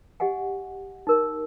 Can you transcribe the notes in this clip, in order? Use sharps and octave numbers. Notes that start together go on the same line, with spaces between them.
G4 D#5 F#5 G#5
D#4 A#4